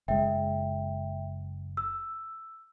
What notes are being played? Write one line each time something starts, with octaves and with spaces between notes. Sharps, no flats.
F#1 G#3 E5 G5
E6